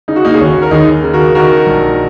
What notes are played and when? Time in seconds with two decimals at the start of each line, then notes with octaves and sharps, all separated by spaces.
0.08 C#3 D#4
0.16 F#4
0.25 A#3 D#4
0.34 G#4
0.39 D#2 C#4 F#4
0.62 A#4
0.71 D#2 D#4 G#4
1.04 C#3
1.13 F#4 A#4
1.35 D#3 F#4 A#4
1.67 A#1